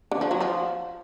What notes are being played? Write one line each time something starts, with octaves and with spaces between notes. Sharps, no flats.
D3
F3
F#3
F3